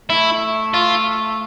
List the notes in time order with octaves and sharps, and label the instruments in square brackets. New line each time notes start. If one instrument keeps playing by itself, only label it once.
[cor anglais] A3 [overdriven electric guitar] E4
[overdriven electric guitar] F4